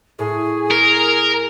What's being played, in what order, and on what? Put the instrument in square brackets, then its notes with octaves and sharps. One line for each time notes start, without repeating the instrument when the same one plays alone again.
[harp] A2 [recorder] G#4
[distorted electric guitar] A#4